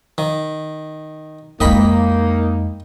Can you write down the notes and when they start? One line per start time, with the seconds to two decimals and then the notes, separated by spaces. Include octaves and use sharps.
0.18 D#3
1.60 F2 G#3 A#3 D#4 D#5 G5 B5